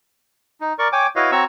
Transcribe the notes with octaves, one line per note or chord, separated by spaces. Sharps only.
D#4
A#4 D5 C#6
C#5 G5 G#5 D6
E4 F#4 B4 C#5 D#5 F5
C4 F#4 C#5 A#5 C#6 E6